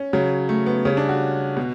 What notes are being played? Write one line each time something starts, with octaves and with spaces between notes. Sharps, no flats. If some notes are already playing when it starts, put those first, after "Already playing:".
Already playing: C#4
C#3 F#3
A3
B3
C#3 G3 C#4
D4
F#4
B2